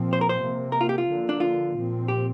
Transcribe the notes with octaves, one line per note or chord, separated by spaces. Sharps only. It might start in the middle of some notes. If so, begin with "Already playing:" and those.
Already playing: A#2 F3 C4
C5
A#4
C5
C3 A#3
A#4
F4
G4
F4
D3 F3 A#3
D4
F4
A#2 F3 C4
G4